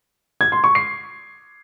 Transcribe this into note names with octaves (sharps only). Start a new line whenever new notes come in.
G#6
C6
C#6
C7